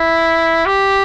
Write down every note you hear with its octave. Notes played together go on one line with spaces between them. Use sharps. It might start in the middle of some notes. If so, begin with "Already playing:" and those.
Already playing: E4
G4